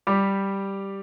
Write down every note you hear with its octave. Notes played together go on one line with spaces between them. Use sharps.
G3 G4